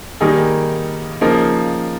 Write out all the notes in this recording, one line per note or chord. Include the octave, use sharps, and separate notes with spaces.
D#3 G3 A#3 D#4 G#4
C#3 F3 A#3 D#4